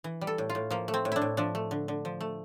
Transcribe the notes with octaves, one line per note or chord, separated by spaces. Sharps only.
E3
G3
A4
A2
F4
A2
F3 A#3
A3
C4
A2
D4 E4
A2
F3 D4
A3
D3
D3
F3
A3